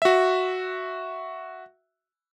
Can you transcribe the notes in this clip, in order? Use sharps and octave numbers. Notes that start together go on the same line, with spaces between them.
F#4 E5